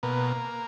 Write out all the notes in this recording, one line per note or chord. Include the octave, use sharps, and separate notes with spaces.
B2 A#3